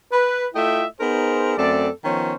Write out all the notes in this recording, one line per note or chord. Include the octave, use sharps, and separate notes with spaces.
B4
A3 E4 F4 D#5 E5 G5
B3 D#4 G#4 A#4 C5
F#2 A3 C4 A4 D5
D#3 F3 B3 C#4 C5 C#5